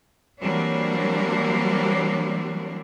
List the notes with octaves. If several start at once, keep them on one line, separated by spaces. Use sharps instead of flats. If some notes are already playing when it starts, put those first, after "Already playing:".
E3 F#3 G3 A#3 C4 D4